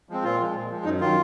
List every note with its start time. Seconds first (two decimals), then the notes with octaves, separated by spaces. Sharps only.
0.09 F3 G#3 C4
0.24 A#2 F4
0.40 F3 G#3
0.54 A#2
0.71 F3 G#3
0.85 F#2 D#4
1.01 D#3 F#3 F4